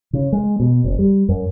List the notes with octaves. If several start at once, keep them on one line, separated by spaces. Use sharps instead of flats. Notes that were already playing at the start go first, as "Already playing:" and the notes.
C#3
G#3
B2
F#1
G3
F#2